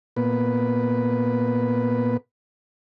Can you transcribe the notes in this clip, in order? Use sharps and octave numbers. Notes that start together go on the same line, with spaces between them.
A#2 B3 B4